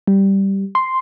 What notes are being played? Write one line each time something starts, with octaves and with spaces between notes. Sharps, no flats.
G3
C6